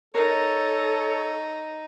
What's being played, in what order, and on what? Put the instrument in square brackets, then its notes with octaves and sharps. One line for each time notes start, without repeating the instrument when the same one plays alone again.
[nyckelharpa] D#4 [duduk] A4 [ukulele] A#4 [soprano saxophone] C#5